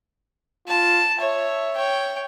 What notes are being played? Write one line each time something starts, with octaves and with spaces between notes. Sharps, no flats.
F4 A5
C#5 E5
C#5 G5